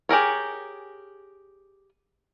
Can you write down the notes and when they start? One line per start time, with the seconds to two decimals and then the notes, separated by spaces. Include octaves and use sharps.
0.09 G4 G#4 A#4 C#5